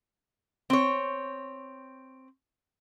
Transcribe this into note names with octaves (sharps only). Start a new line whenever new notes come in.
C4 C#5